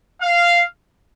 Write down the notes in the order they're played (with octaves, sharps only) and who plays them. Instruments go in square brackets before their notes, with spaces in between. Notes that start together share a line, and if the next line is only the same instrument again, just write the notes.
[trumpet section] F5